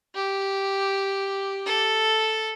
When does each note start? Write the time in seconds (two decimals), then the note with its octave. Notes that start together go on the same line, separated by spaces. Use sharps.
0.15 G4
1.67 A4